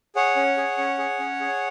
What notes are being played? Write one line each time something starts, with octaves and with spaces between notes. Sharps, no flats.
G#4 C#5 F#5
C#4
G#4
C#4
G#4
C#4
G#4